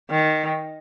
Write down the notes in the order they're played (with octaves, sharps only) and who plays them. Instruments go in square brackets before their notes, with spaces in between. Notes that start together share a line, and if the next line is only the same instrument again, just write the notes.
[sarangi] D#3